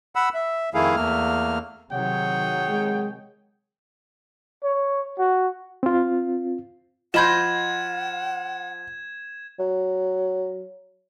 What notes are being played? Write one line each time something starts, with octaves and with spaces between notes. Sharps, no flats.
F#5 B5 E6
E5
F2 D#3 A3 E4 G#4 F5
E2 A3 A#3 F6
C3 D#3 F#3 G#4 C#5 F#5 G5
G#3
C#5
F#4
C4 F4
F3 D#5 F#5 B5 C6 G6 G#6 E7
F#3